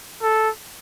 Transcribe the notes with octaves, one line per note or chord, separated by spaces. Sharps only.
A4